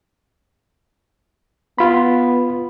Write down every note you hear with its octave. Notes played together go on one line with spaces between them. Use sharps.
B3 F4 B5